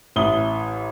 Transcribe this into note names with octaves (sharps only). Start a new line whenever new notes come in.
A1 E4 D#6 G7